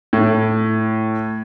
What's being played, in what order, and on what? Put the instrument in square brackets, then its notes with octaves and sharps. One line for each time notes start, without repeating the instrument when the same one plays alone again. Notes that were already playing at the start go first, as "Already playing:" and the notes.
[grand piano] A2